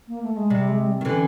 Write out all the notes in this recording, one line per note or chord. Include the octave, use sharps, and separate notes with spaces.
A#3
A3
G#3
C3 G3
G#3
G3
D#3
D3 E3 C#4